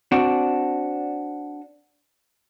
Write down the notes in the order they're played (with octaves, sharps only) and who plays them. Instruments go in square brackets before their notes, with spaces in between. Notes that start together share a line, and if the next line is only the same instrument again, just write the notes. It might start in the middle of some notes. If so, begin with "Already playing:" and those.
[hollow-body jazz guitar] C4 D4 F#4